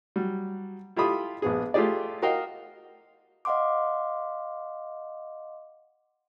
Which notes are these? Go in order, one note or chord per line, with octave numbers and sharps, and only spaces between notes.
F#3 G3
E4 F4 G4 A4 B5 D#6
A#1 B3 G#4
A3 F4 G4 G#4 D5
F#4 A#4 D#5 F5 G5
D#5 F5 F#5 C6 D6